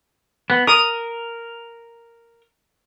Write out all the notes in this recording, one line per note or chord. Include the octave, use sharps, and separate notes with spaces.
B3
A#4 D#6